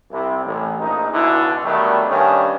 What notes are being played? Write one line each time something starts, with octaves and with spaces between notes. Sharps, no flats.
C2 C3 E4
A1
A#1 D#4
C#2 B2 D3 E4
D3 D#3 F#3 G3 A3 B3
G2 D#3 C#4